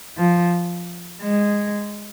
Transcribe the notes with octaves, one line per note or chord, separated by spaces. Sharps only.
F3
G#3